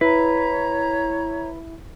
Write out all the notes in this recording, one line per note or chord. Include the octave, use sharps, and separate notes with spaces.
E4 B4 C#5 A#5